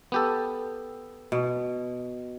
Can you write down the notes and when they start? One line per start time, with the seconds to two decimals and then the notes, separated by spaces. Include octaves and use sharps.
0.12 B3 G4 A4
1.32 B2